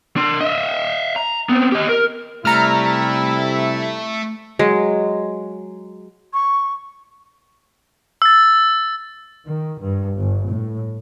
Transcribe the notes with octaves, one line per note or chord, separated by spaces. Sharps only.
D4 C6
D#5 E5
A#5
B3 C4
G4 D#5
A#4
C3 G3 A3 E4 A#5 F6
F#3 G#3
C#6
E6 A6
D#3
G2
G1
A2